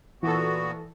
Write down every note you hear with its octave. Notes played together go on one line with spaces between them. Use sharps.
A#2 E3 B3 F#4 A4